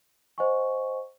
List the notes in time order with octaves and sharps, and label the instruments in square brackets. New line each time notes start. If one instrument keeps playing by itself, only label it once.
[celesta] C5 D#5 F#5 G#5 C#6